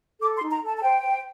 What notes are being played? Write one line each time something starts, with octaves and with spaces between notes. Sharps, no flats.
A4 D6
C6
D#4
A#5
A4 A5
A5
C5 G5
C5